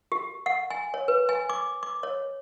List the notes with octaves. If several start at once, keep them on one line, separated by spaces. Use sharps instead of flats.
G4
F#5
G#5
C#5
B4
G#5
D6
D6
C#5